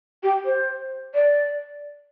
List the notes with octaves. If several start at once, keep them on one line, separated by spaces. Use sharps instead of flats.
G4
C5
D5